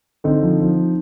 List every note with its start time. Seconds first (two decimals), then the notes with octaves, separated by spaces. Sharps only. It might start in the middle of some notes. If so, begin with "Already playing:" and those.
0.24 D3 C4 D#4
0.42 F3
0.60 F3